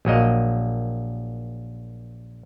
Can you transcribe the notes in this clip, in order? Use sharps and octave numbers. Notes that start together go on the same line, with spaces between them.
A#1 F#3 A#3 D#5